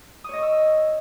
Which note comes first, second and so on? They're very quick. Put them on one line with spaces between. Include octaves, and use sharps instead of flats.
D#6 C#5 D#5 C#6 E6